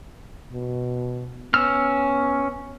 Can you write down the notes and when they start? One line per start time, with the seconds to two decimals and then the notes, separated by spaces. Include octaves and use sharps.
0.53 B2
1.54 B3 C#4 E6 F6